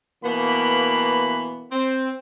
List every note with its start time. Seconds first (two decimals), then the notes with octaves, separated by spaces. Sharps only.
0.24 B2 E3 A#3 B3 B4 B5
1.72 C4